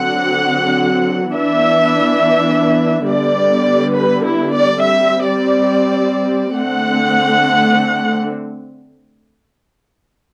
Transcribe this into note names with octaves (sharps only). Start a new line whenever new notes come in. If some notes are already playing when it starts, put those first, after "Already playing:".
Already playing: D3 F#3 C4 F#5
E3 B3 D4 E5
D3 G3 B3 D5
B4
E4
D5
G3 C4 E5
D5
D3 A3 C4 F#5